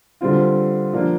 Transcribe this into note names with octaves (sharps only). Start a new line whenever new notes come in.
D3 G3 C4 F4
F3 A#3 D4